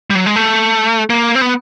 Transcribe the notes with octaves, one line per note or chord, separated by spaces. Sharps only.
G3
F#3
G#3
A3
A#3
C4
B3